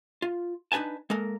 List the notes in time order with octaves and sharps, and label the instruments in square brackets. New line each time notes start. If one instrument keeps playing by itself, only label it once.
[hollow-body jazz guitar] F4
D4 D#4 B4 G#5 A5
G#3 A#3 A4 A#4